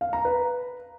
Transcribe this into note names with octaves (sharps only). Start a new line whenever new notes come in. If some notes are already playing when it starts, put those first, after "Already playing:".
F5
A#5
B4